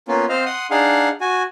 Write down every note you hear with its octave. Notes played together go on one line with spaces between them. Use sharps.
A#3 B3 C#4 F4
C4 C5 D#5 F5 F6
F#5 C6 D#6
D4 D#4 G#4 F5 F#5
F#4 G#5